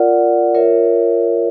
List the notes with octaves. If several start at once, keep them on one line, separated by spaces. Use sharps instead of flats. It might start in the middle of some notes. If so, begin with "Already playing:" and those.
Already playing: F4 A#4 D5 F#5
F4 A#4 C#5 E5